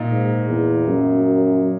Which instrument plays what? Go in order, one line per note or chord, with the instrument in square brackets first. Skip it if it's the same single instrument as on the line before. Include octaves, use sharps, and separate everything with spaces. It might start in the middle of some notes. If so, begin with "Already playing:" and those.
Already playing: [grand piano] A#2 D#4
[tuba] G#2
E2
F#2